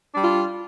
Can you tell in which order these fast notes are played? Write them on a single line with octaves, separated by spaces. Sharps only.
D4 G3 F4